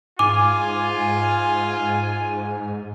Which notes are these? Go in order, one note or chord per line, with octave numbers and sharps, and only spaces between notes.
G#2 F4 G#5 D6